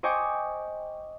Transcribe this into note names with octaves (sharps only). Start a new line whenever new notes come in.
C5 D#5 G5 G#5 C#6 D6